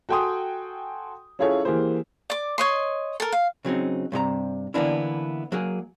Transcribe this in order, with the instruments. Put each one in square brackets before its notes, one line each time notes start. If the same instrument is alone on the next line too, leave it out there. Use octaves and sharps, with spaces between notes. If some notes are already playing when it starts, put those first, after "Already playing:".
[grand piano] F#4 A4 G5 G#5 C6 D#6
C#4 E4 F4 G#4 A4 C#5
E3 A#3 G4 G#4 C5
[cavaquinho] D5 D6
C#5 D#5 C6
A4 A#4
F5
[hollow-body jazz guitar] C#3 F#3 C4 D#4
G2 C3 G#4 A#5
D3 E3 A#3 B3 D4 E4
F#3 A#3 G#4